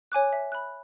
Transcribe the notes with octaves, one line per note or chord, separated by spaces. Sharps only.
C#5 G#5 D6 F#6
E5
B5 F#6